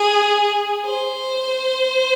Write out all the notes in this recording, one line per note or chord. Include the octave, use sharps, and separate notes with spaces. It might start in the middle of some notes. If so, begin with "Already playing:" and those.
Already playing: G#4
C5